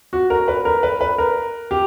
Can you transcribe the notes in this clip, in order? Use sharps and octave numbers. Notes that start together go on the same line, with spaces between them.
F#4
A#4
B4
A#4
B4
B4
A#4
G4